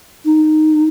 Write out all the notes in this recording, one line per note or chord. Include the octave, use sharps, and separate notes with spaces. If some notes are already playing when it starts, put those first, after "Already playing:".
D#4